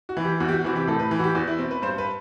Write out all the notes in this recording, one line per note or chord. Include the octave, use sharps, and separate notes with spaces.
F#4
E3
G4
E2 F#4
G4
F#4
C3 E3 F#4
G4
A2 A4
B4
E3
F#4
G4
E2 F#4
E4
B2 C4
B4
G2 C5
B4